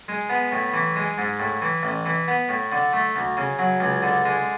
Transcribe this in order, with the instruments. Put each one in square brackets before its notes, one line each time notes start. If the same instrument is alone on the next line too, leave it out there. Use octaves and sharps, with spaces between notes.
[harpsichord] G#3
B3
A2
E3
G#3
G#2
A2
E3
A1
E3
B3
A2
D3
A3
D2
C#3
F#3
C#2
D3
G#3